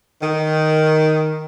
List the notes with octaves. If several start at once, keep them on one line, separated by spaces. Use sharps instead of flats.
D#3